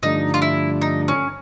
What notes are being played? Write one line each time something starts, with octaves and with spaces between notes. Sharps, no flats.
G2 D3 F3 A3 D4 D#4
F4
E4
D#4
C#4